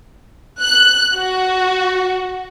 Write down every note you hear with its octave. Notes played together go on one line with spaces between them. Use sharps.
F#6
F#4